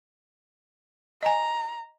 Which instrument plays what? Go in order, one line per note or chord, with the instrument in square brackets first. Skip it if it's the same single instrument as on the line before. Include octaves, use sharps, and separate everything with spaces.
[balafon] D#5 G#5 [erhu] A#5